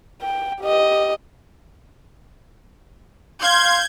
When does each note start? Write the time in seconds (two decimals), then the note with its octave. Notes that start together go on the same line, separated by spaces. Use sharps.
0.22 G5
0.61 G4 D#5
3.42 F5 C6 G6 G#6